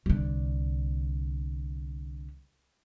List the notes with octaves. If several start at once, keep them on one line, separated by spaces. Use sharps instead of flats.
C2 D3